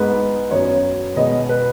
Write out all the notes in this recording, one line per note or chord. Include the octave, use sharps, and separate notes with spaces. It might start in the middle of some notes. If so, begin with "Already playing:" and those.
Already playing: G#2 G#3 B3 B4
F#2 F#3 B3 C#5
B2 G#3 B3 D#5
B4